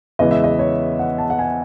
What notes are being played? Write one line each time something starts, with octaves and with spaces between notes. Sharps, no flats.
E2 C#3 E3 G#3 D#5
E5
D#5
C#5
F#5
A5
F#5
G#5